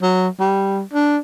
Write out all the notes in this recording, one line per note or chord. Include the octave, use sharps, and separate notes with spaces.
F#3
G3
D4